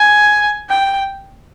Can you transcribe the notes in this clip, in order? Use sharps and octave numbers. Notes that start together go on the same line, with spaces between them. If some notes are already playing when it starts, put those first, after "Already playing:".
Already playing: G#5
G5